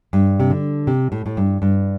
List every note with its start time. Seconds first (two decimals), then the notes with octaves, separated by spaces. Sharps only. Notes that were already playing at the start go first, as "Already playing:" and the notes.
0.13 G2
0.40 C3
0.50 D3
0.87 C3
1.12 A2
1.26 A2
1.37 G2
1.62 G2